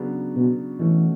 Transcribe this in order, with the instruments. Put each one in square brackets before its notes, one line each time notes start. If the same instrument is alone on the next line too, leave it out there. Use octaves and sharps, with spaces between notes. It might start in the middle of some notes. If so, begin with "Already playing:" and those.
Already playing: [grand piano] C#3 F#3 B3 D4 F#4
[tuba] B2
[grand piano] B2 A3 C#4 F#4 [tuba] E3